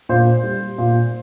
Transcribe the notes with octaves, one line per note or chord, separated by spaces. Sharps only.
A#2 C5
G3
A#2